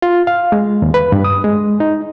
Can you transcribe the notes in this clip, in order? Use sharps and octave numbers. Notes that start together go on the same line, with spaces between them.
F4
F5
G#3
D#2
B4
G2
D#6
G#3
D#4